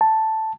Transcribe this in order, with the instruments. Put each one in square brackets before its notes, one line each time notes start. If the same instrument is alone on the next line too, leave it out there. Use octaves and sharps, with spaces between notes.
[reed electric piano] A5